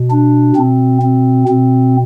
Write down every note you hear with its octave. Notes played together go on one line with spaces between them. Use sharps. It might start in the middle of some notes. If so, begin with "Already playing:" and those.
Already playing: B2
D4
B2 C4
C4
B2 C4